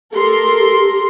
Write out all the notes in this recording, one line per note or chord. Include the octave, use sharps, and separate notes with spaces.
G4 A4 A#4 C6